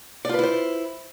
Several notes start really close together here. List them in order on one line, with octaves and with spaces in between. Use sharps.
D5 F4 B4 E4 C5